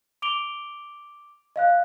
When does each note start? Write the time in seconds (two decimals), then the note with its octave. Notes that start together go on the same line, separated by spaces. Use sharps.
0.22 D6 D7 F7 G7
1.56 D#5 F5 F#6